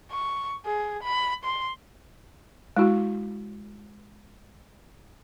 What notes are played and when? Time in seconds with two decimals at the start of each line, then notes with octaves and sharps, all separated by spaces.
0.11 C#6
0.66 G#4
1.03 B5
1.45 C6
2.76 G#3 E4 F#4